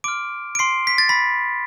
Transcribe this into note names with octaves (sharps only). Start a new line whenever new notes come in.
C6 D6 F6 D7
D7
C6 C7
B6
A6
B5 B6